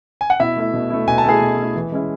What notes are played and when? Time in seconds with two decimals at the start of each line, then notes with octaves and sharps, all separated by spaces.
0.21 G#5
0.30 F#5
0.40 B2 E4 E5
0.57 A3 E4
0.74 B2
0.90 A3 E4
1.07 B2 G#5
1.18 A5
1.24 A3 E4 G#4 G#5
1.41 B2
1.58 A3 E4
1.76 E3
1.92 G#3 C#4 E4